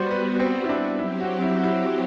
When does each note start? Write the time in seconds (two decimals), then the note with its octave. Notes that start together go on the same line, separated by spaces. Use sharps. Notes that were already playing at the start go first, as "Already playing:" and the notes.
Already playing: G3 B3 F#4 C5 D5
0.11 B4
0.39 C4
0.64 E4
0.69 D4
0.98 F#3 C4 E4 G4
1.20 F#4
1.42 E4
1.59 F#4
1.64 E4